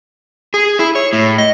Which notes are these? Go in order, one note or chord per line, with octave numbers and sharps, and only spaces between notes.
G#4
E4
C#5
A2
D#5